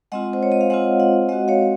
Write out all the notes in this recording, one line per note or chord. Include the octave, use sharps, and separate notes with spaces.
G#3 C4 F4 D#5 F#5
C5
C#5
D#5
F5
G#3 C4 F4 D#5 F#5
D#5 F#5
G#3 C4 F#4 D#5 F#5
C#5 F5